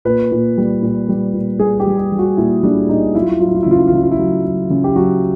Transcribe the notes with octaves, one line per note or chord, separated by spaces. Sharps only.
A#2 B4
A#2
G3
A#2
G3
A#2
G3 G#4
G4
G3
G4
G3
F#4
A#2 E4
G3 D4
A#2 D#4
F#3 E4
F4
E4
F#3 F4
E4
F4
E4
C#3 F4
E4
F4
C#3 E4
F4
E4
F#3
F#3
C#3
G4
F#3 F#4